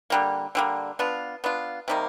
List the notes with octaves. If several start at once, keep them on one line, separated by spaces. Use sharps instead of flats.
D3 G3 A#3
D3 G3 A#3
B3 D4 F4
B3 D4 F4
C3 D#3 G3 A#3